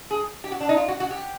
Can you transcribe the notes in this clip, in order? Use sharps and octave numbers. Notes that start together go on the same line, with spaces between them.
G#4
G4
F#4
D4
D#4
F4
F#4
F#4
G4